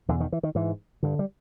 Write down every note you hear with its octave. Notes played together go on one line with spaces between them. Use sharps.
E2 B2 D3
D#3
E3
D#3
G#2 E3
G2 D3
G3